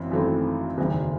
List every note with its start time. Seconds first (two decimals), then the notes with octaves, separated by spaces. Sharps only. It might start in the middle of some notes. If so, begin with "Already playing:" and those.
Already playing: G#1 F#2 E3 C4
0.11 G#1 F#2 E3 A3 C4
0.78 F#1 E2 D#3